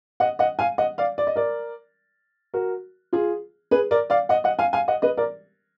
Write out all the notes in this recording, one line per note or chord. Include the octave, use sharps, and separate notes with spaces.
D#5 F#5
D#5 F#5
F5 G#5
D#5 F#5
D5 F5
D5
D#5
A#4 D5
F#4 A#4
F4 G#4
G#4 B4
A#4 D5
D5 F5
D#5 F#5
D#5 F#5
F5 G#5
F5 G#5
D#5 F#5
B4 D#5
A#4 D5